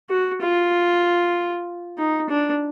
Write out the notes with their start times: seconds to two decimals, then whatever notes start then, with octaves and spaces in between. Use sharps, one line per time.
0.10 F#4
0.41 F4
1.98 D#4
2.29 D4